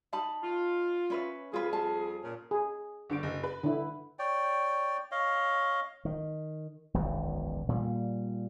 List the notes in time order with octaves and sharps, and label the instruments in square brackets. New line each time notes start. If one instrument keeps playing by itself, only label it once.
[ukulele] D#4 A5 B5
[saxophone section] F4
[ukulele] C#4 B4 E5
[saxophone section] F2 G3 G#4 [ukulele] F4 B4
[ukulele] F4 A5
[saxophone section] A#2 C#4
[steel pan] G#4
[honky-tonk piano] G1 D3 D7
F#1
B4
[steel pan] D3 E4
[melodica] C#5 D5 G5
C#5 D#5 F5
[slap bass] D#3
E1 B1 F#2 D#3
A#2 G3